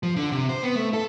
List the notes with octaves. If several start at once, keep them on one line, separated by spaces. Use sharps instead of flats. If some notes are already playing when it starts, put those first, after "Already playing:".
F3
D3
C3
C5
B3
A3
A4